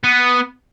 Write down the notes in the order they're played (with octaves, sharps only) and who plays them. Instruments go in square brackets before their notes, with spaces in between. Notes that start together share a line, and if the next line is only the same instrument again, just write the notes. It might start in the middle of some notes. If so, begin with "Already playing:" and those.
[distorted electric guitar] B3